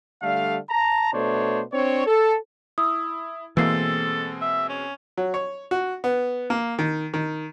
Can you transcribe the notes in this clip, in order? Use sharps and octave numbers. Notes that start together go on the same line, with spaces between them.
D3 G3 A3 F5
A5 A#5
B2 A3 D4 C5 C#5
C4 D4 C#5
A4
E4 D#6 E6
B2 E3 G#3 A#3 C4 A4 E6 C7
E5
C#4
F#3
C#5
F#4
B3
A#3
D#3
D#3